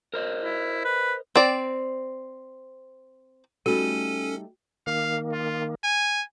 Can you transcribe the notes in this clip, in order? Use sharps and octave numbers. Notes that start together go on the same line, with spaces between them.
A#4 C5 D#5
E4
B4
C4 D5
G3 A3 C#4 D#4 F#4 A4 D#7
D#3 A#3 F5
F4
G#5